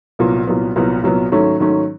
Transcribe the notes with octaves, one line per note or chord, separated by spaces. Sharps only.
C2 A#2 F#3 B3
C2 A#2 F#3 B3
C2 A#2 F#3 B3
C2 A#2 F#3 B3
G#2 D#3 F#3 A3 C#4
G#2 D#3 F#3 A3 C#4